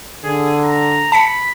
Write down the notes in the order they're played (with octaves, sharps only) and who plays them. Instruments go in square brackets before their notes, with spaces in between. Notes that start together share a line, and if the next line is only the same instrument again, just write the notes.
[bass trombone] D3 [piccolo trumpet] G#4
[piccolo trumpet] A#5
[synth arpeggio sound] A5 B6 C#7 [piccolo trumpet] B5